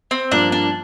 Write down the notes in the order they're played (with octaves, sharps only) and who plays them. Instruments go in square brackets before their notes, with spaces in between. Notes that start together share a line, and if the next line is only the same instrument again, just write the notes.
[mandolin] C4
[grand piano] G2 F3 A#3 F4 [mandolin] D4
[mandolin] D4